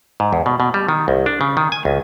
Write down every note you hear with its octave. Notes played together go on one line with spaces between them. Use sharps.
G#2
E2
B2
B2
G3
D#3
C2
D4
C#3
D#3
G#5
C#2